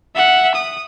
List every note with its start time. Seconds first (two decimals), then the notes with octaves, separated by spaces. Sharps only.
0.15 E5 F#5
0.55 D#6